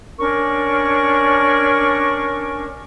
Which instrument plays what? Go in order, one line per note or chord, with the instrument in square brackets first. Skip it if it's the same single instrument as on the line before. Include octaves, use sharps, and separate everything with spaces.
[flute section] C#4 D4 A#4 C#6